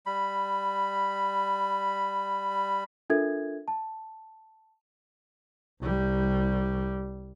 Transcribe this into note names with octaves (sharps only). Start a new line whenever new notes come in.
G3 B5
D4 F4 A4 A#4 E5 G#6
A5
C2 G3